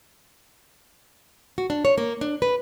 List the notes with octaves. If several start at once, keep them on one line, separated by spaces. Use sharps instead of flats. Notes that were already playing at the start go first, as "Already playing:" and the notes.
F#4
D4
C#5
A#3
D4
B4